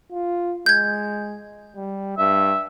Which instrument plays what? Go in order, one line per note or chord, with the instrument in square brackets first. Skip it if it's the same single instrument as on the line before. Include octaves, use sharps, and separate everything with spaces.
[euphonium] F4
[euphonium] G#3 [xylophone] G6 G#6
[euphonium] G3
[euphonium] G2 [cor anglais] E5